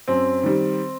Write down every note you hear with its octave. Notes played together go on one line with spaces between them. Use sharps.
F#2 C4
D#3 G3